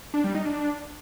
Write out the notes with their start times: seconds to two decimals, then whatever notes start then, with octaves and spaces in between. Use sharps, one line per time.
0.14 D4
0.24 G3
0.35 D#4
0.45 D4